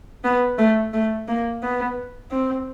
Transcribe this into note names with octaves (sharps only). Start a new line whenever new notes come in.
B3
A3
A3
A#3
B3
C4